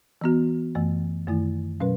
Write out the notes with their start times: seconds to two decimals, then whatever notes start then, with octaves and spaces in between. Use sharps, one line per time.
0.21 E3 B3 F#4
0.75 F#2 E3 A3
1.27 F#2 D#3 A3 E4
1.80 B2 F#3 C#4 B4